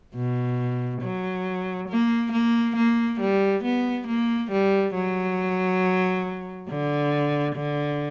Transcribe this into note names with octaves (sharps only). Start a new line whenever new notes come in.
B2
F#3
A#3
A#3
A#3
G3
B3
A#3
G3
F#3
D3
D3